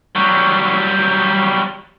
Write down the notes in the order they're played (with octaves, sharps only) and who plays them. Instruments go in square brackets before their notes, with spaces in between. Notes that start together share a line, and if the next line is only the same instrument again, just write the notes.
[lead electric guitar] F#3 G3